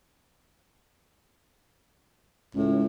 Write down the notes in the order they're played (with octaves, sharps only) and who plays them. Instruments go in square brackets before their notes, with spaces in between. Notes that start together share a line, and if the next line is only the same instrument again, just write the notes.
[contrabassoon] C#2 [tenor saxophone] A2